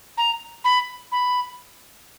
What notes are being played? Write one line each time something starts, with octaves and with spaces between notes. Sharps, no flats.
A#5
B5
B5